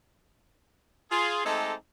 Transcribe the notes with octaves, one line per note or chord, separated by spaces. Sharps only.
F4 G#4
G#3 A3 C4 D#4 G4 A4